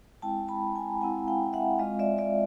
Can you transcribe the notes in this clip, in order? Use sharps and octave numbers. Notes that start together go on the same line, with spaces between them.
G#3 C4 E4 G5 A5
A5 B5
G#5 A#5
G#3 C4 E4 F#5 G#5
F5 G5
E5 F#5
G#3 C4 F4 D#5 F5
D5 E5
D5 E5